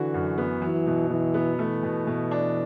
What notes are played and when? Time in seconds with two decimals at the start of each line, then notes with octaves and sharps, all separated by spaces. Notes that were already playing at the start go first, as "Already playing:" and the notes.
Already playing: D3 E3 F#4
0.14 F#2
0.38 B3
0.62 E3 F#3
0.87 B2
1.10 B2 E3
1.34 B3
1.59 E3 A3
1.83 B2
2.07 B2
2.31 D4